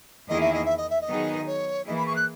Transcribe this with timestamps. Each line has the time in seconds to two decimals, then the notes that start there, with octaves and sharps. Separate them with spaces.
0.29 E2 D#3 A#3 E4 G#4 D#5
0.41 E5
0.53 D#5
0.65 E5
0.77 D#5
0.90 E5
1.01 D#5
1.08 D#3 F#3 B3 D#4 G#4
1.47 C#5
1.87 E3 A#3 E4 G#4 D#5
1.97 B5
2.06 C#6
2.16 F#6